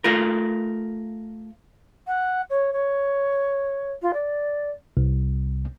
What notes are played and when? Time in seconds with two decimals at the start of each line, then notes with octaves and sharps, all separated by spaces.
0.04 A3 F4 A#4
2.07 F#5
2.50 C#5
2.73 C#5
4.02 F4
4.14 D5
4.97 C2